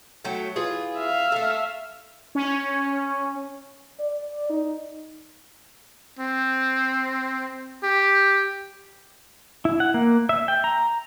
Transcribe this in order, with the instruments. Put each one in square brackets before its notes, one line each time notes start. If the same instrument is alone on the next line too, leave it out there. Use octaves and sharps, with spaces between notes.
[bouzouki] F#3 A3 G5
E3 F4 G#4
[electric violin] E5 F5
[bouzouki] A3 A4
[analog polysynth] C#4
[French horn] D5
D#4
[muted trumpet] C4
G4
[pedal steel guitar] E4
F#5
A#3
E5
G5
A#5